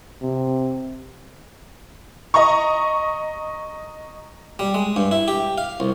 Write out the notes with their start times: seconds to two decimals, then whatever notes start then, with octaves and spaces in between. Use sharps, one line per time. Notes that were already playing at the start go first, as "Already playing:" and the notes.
0.22 C3
2.34 D#5 A#5 C#6
4.59 G3
4.74 G#3
4.96 G2
5.11 E4
5.28 G4
5.58 F5
5.80 C2